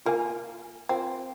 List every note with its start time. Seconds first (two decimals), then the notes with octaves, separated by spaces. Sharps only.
0.06 A#3 F4 A#4 F5 G#5
0.89 C4 F4 A#4 F5 G#5